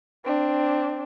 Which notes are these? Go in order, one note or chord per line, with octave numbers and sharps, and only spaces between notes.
C4 D4